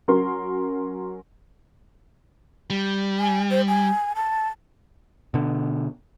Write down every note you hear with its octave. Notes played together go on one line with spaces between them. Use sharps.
F#3 C#4 A#4 C6
G3
G#5
C5
G#5
A5
B2 D3